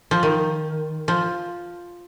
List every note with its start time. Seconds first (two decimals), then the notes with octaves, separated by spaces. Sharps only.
0.11 F3
0.23 D#3
1.08 F3